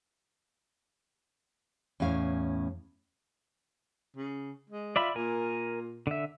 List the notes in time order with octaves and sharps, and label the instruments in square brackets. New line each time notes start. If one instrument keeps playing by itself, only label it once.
[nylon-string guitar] E2 A2 C#4 F5
[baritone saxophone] C#3
G#3
[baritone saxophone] F4 [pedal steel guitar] D5 E5 B5
[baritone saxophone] A#2 [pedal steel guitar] A#4 G#5
[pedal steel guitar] D3 E5